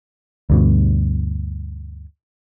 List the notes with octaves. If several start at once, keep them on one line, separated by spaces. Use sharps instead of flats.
D2 G2 B2